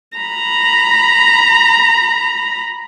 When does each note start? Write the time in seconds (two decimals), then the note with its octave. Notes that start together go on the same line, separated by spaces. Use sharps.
0.18 A#5 B5